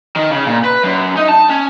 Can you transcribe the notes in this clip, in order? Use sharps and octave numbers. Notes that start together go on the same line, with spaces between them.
D#3
C#3
A#2
B4
F#2
D#4
A5
C#4